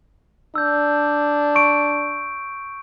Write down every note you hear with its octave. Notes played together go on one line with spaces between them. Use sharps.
D4 E6 G6
C#6 D7